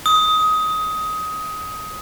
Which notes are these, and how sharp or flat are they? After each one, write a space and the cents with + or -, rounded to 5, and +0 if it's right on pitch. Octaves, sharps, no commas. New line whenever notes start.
D#6 +20